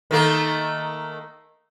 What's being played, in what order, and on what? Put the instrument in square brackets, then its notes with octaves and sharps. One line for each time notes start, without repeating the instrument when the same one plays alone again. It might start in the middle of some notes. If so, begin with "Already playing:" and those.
[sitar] D#3 A3 A#3